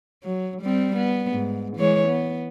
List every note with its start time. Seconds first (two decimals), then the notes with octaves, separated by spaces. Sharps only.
0.23 F#3
0.61 G3 C4
0.96 B3
1.31 G#2
1.76 E3 G#3 C#5
2.08 B3